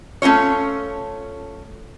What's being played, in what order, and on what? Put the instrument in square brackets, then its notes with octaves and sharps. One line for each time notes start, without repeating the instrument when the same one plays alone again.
[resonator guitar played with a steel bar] A3 C#4 D#4 F4 C#5